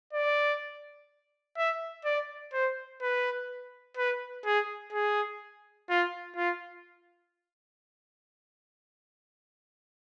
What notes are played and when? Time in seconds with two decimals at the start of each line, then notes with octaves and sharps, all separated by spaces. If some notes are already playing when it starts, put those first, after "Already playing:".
0.13 D5
1.57 E5
2.05 D5
2.53 C5
3.02 B4
3.97 B4
4.45 G#4
4.93 G#4
5.89 F4
6.36 F4